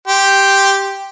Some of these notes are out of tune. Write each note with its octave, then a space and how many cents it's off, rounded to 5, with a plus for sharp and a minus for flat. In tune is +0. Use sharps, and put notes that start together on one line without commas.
G4 +0 C6 +0